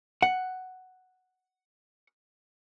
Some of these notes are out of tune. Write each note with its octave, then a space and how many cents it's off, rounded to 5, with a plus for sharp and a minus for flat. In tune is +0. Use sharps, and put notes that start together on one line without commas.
F#5 +5